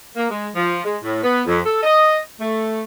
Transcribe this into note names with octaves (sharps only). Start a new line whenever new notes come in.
A#3
G#3
F3
G#3
A2
B3
F2
A4
D#5
A3